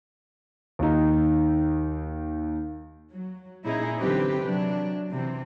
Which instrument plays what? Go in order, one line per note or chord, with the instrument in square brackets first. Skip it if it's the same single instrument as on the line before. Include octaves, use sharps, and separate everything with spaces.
[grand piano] D#2 D#4
[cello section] F#3
A#2 C#4 D#4 E4 G#4
D3 E3 F#3 C4 G4 B4
C3 F#3 D4
C3 E3 C4